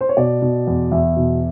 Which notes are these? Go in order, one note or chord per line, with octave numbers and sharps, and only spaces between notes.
C5
C#5
B2 D5
B2
E2
E2 E5
B2